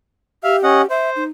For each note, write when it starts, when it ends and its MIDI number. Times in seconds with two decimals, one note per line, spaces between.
0.44 0.86 67
0.44 0.56 76
0.44 0.56 77
0.63 0.82 61
0.63 0.82 75
0.63 0.82 78
0.90 1.24 72
0.90 1.10 76
1.16 1.30 63